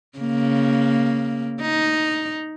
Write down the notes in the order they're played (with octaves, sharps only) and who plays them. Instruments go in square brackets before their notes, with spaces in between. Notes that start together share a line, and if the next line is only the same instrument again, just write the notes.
[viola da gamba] C#3 A#3
D#4